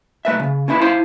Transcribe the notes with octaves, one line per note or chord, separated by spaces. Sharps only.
B1 A3 B4 E5
C#3
C#4 D4 E4 B4
E4 C5 F5 A5 C6